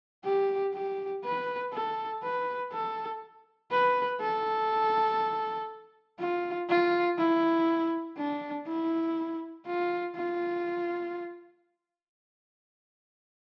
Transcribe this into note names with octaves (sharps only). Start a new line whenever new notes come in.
G4
G4
B4
A4
B4
A4
B4
A4
F4
F4
E4
D4
E4
F4
F4